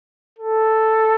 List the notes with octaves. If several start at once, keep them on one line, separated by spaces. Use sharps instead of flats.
A4